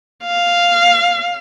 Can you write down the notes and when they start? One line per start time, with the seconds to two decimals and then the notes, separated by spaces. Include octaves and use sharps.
0.24 F5